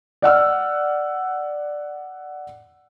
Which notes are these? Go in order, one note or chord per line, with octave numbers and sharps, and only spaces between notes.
D5 F#5 E6 F6